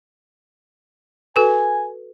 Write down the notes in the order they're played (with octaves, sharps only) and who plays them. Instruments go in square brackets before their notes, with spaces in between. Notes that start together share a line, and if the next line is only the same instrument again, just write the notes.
[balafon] F#4 A4 B4 [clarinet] G#5